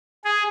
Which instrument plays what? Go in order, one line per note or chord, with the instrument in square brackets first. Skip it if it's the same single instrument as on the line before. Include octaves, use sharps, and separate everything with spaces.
[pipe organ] G#4